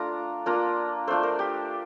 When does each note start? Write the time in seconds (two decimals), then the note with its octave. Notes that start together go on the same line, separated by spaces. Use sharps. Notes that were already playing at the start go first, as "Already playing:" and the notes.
Already playing: A3 D4 F4 A#5
0.46 A#3 D4 F4 A#5
1.07 A3 D4 F4 C5
1.23 A#4
1.39 G4